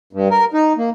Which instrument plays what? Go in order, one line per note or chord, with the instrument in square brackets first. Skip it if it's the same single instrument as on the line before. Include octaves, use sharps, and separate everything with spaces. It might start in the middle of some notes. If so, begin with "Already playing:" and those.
[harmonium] G2
A#4
D#4
A#3